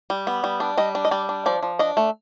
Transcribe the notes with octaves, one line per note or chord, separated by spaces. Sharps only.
G3
B3
G3
D4
G3 D#5
D4
D#5
G3 D5
D4
F3 D5
F3
D4 D#5
A3